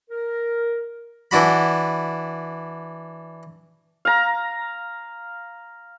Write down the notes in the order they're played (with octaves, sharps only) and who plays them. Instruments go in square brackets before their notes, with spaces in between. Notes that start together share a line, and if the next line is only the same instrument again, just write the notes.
[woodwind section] A#4
[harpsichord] E3 D4 F#4 B5
[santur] F5 A#5